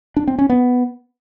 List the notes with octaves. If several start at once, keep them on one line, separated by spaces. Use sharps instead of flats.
D4
C4
C#4
B3